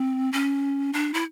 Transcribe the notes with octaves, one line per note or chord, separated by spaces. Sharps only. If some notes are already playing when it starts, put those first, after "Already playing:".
Already playing: C4
C#4
D4
E4